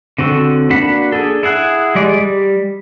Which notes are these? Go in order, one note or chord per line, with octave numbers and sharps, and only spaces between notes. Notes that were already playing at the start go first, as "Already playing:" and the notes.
D3 C4 F#4 A4
A#3 D4 F#4 F#5 B5
D4 G#4 A4
E4 G#4 F#5
G3 G#3 D5
G3